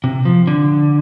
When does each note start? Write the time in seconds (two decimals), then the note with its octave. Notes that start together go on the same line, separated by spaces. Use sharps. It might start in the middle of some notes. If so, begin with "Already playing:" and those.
0.04 C3
0.25 F3
0.47 D3